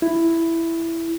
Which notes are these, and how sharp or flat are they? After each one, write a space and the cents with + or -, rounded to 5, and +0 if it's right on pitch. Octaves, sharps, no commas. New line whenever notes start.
E4 +5